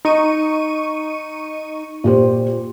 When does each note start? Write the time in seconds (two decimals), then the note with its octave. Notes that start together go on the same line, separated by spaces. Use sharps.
0.05 D#4 C#6 D#7
2.04 A#2 G4 C5